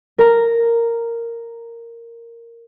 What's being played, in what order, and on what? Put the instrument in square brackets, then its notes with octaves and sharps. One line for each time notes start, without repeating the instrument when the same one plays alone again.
[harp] A#4 A#5